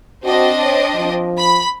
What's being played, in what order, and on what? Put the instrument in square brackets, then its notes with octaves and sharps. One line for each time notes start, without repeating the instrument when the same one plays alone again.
[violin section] C4 D4 D#5 [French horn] F#4
[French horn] C#5
F3
[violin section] B5